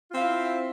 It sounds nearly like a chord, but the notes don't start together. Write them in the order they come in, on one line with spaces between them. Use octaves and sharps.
F4 C4 F5 E4